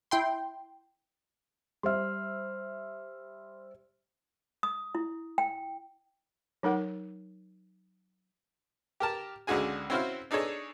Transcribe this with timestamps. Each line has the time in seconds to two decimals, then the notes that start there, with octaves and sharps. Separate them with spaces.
0.11 E4 G5 C6
1.83 G3 C5 E5 C6 F6
4.63 D#6
4.95 E4
5.38 G5
6.63 F#3 D#4 A#4 F#5
9.00 G4 A#4 A5
9.47 C#2 D3 D#4 F#4 G#4 G#5
9.90 C4 C#4 E4 F#4 C5 F5
10.31 D4 D#4 G#4 A4 C#5 D#5